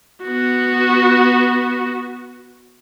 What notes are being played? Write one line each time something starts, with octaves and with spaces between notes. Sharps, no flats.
B3 F#4